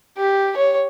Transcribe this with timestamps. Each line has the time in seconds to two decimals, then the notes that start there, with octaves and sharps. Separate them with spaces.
0.17 G4
0.57 C#5